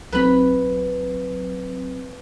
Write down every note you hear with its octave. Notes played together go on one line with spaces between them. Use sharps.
B1 F#3 C4 B4 B5